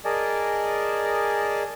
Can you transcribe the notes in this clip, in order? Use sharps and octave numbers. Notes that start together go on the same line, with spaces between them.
G#4 A#4 D5 D#5 G#5 A5